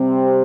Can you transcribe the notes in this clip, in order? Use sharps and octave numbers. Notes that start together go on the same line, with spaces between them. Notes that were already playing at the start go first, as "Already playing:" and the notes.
Already playing: C3 G3 C4